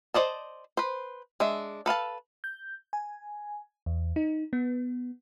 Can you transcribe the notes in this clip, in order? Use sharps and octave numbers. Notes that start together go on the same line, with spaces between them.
C5 D5 D#5 A5
B4 C5
G#3 D4 E5
A4 B4 F5 A5
G6
G#5
E2
D#4
B3